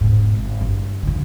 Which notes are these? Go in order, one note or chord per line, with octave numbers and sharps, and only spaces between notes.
E1 G#2
G#1
G2 E3
F2 D3